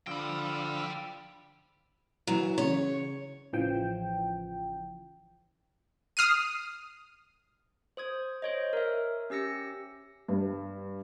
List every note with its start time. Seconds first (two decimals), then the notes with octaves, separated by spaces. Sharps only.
0.07 D3 F3 G5 B5 E6
2.27 E3 F#3
2.58 C#3 C#5
3.53 A1 C#3 E3 F3 G5
6.17 D#6 F6 C7 D#7
7.97 C5 D#6 G#6
8.42 C5 C#5 D#5
8.73 A#4 E5
9.30 C#4 G4 E6 A#6 C#7
10.28 G2